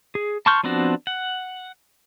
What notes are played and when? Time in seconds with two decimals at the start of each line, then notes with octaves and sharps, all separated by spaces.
0.15 G#4
0.46 A5 C6 C#6 F6 G6
0.63 F3 B3 C4 D4 F#4
1.07 F#5